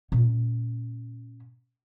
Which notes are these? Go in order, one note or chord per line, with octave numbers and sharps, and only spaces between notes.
A#2 C#4